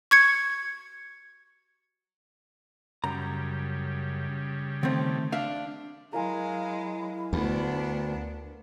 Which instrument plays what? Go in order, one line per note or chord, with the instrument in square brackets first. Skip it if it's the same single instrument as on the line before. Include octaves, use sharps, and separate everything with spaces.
[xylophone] C#6 G#6 C#7
[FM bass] F#2 [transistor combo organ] C#3 G3 [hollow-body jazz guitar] A#5
[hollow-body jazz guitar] D#3 C4 [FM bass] A3
[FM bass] D4 [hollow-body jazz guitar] E5 F5
[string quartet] F#3 G#3 [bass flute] E4 [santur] A#4 F5 G#5
[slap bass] D2 [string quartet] A3 B3 D4